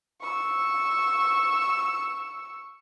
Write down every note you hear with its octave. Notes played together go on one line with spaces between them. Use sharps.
C#6 E6